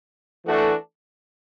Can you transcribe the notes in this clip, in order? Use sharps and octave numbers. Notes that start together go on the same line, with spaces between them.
E3 A3 D4 F#4 A4